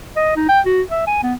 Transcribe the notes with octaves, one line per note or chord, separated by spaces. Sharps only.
D#5
D#4
G5
F#4
E5
G#5
B3